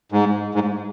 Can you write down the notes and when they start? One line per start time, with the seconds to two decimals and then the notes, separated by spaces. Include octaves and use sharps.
0.12 G#2
0.55 G#2